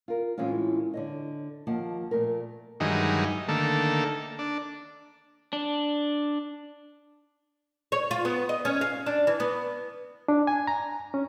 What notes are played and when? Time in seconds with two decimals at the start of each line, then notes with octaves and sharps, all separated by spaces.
0.08 F4 A#4
0.38 A2 E3 G#3 C4 C#4 F4
0.94 D3 C#5 D#5
1.67 D#2 F3 A#3 D#5 F#5 A5
2.11 A#2 F3 A3 A#4
2.80 G2 D#3 E3 F#3 G#3 D#4
3.48 D3 D#3 A3 A#3 A4
4.39 D4
5.53 D4
7.92 C#5
8.11 F4
8.25 B3
8.49 D#5
8.65 C#4
8.81 F5
9.06 D4
9.27 E3
9.40 B3
10.28 D4
10.47 G#5
10.67 A#5
11.14 C#4